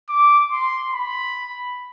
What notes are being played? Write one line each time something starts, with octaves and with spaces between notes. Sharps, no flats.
D6
C6
B5